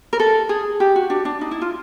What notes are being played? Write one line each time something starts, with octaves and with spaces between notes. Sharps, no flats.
A#4
A4
G#4
G4
F#4
D4
D4
D#4
E4
F4